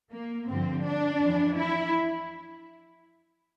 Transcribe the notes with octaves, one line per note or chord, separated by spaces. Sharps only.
A#3
G2 D3 F3 C4
D4
F2 E3
E4